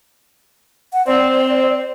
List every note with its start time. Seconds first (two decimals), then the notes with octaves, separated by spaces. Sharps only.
0.93 F#5
1.07 C4 D5